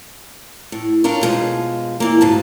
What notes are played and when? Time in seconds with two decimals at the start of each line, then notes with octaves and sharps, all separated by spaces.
0.72 A2
1.04 C#4 D4 F4 A#4
1.21 B2 F3 G#3
2.00 A#2 E3 A#3
2.21 D2 G#2 F3 F#4 A5